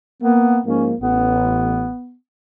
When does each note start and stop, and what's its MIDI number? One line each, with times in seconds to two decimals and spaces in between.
0.22 0.60 58
0.22 0.59 59
0.66 0.93 44
0.66 0.93 53
0.66 0.93 58
0.66 0.87 61
1.01 1.87 33
1.01 2.16 59